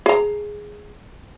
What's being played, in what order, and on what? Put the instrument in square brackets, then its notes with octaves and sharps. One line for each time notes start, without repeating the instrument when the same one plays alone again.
[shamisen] G#4 A#5